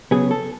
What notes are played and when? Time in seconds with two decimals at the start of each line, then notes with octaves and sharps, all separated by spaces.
0.11 C#3 F#3 B3 G#4
0.31 A4